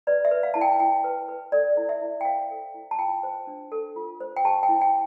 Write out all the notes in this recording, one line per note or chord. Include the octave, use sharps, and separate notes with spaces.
B4 D5
E5
B4
F5
E4 A5
G5
E4 G5
B4
B4
A4 D5
E4
E5
E4
G5
C5 F5
A4
E4
A5
F4 G5
C5
D4
A4
F4
C5
G5
G4 A5
G5
E4
G5